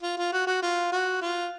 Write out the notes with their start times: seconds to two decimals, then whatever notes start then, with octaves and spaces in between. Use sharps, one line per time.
0.03 F4
0.18 F4
0.32 F#4
0.47 F#4
0.62 F4
0.92 F#4
1.21 F4